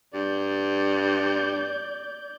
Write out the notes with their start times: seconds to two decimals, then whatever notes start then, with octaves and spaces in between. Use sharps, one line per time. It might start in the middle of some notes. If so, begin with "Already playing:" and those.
0.14 G2 D5 G6